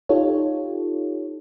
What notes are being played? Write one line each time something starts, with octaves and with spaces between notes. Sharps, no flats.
D#4 F4 G4 A4 C#5